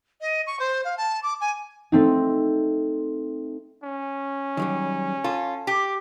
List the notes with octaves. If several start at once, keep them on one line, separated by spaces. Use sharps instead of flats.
D#5
C#6
C5
F5
A5
D6
G#5
A3 C4 D#4
C#4
D#3 F#3 G3
F4 A4
G4